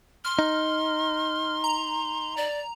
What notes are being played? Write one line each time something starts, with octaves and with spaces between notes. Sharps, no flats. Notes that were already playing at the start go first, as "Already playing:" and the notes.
C6 F6
D#4
A#5
D5